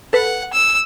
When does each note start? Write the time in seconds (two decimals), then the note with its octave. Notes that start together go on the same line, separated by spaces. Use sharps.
0.13 A4 B4 F#5
0.53 E6